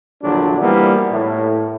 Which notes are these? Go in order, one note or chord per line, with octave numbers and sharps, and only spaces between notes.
A#1 E2 D3 F#3 G3 D4
E3 F3 G3 A#3 B3 E4
A2